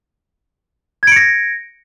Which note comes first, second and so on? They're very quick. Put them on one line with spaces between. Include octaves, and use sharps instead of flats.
G#6 D7 C#7 A#6